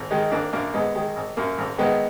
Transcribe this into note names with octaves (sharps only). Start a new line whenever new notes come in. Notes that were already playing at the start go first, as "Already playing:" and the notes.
Already playing: G#1
D#3 G#3
G#1 A#3 D4
F#2 A#3 D4
G#1 G#3 B3
D#3 G#3
G#1
F#2 A#3
G#1
D#3 G#3 B3